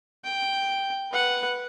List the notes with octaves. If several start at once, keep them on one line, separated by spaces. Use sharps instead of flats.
G5
B4 F#5